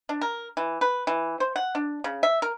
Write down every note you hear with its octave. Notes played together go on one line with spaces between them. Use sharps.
D4
A#4
E3
B4
E3
C5
F#5
D4
C#3
E5
A#4